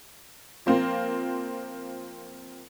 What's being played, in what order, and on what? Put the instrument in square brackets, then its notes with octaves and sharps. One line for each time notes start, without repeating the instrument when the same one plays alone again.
[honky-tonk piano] F3 A#3 C4 F4